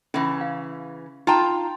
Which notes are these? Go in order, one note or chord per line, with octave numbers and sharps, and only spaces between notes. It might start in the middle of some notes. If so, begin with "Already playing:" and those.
C#3 E3 C#4 E5
F5
D#4 F4 G5 A5 A#5